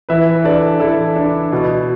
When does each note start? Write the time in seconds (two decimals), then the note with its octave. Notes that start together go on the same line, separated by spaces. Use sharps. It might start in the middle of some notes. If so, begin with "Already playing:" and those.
0.09 E3 B4 E5
0.35 B4
0.44 D4 A4 D5
0.80 E3 E4 A4
1.16 D4
1.52 B2